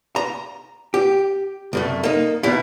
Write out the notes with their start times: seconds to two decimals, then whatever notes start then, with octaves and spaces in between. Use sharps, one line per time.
0.16 A#5
0.94 G4
1.73 C2 F#2 A3
2.03 A#3 D#4
2.43 D#2 B2 E4